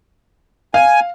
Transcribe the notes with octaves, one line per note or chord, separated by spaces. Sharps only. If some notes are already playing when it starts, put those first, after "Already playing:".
F5 G#5